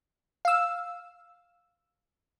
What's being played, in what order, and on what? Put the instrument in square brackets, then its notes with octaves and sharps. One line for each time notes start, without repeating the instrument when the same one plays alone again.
[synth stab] F5 E6